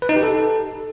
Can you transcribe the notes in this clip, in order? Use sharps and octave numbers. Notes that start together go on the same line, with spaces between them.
B4
D#4
G4
A4